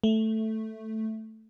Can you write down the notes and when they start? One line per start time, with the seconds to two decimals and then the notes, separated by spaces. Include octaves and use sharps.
0.04 A3